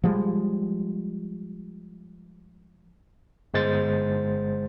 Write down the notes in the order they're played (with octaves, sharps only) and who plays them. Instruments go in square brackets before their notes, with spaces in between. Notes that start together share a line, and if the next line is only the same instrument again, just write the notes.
[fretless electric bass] F3 G3 G#3
[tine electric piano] G1 G#3 C5 A6